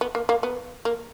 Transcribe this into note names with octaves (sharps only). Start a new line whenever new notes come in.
B3
A#3
A#3
B3
A#3